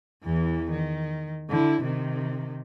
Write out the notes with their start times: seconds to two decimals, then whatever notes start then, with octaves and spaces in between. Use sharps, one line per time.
0.24 E2 E3
0.71 D#3
1.49 D3 E4
1.82 C3 D#3